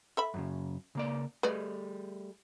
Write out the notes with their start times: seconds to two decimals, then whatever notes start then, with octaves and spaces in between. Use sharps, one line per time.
0.17 A4 E5 B5
0.34 F#2 A2 C#3
0.95 C#3 A#3 D5
1.43 G3 A3 G#4 B4 D5 D#5